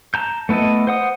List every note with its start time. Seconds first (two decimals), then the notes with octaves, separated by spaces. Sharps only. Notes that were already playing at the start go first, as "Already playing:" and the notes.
0.14 A5 A#5 G6
0.49 A3 B3 E4 A4 D#5
0.87 C5 F#5 D#6